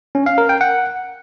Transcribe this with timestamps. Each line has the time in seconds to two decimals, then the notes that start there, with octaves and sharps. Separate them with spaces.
0.15 C#4
0.26 F5
0.38 A#4
0.49 G5
0.61 F#5